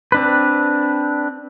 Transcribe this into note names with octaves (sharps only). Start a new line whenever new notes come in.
C4 D4 B4